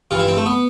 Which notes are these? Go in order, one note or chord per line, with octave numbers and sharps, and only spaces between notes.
G2 E3 F4
E4
C4
A3
B3